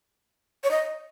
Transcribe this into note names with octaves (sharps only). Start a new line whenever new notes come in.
C#5
D#5